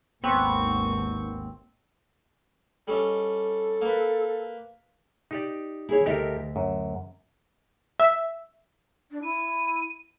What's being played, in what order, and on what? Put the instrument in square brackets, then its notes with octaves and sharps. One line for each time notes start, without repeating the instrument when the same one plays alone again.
[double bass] G#1 D#2 [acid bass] B3 [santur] C4 [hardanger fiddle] C#6
[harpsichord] G3 C#4 D#5 [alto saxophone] A4
[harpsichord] A#3 B4
[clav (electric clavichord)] D#4 G4 D5
[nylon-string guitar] E4 G#4 C#5
[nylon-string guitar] D2 D#5 E5 [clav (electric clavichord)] G4 A4 A#4
[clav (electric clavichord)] F#2
[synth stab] E5
[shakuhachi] D4
[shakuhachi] E4 [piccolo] D#7